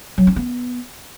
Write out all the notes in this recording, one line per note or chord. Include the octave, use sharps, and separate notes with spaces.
F#3
C#4
B3